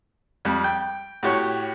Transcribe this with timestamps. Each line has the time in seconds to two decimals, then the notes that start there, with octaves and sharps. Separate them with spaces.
0.45 F2 G3
0.64 G5
1.23 A2 F#4 G4 C#5 C#6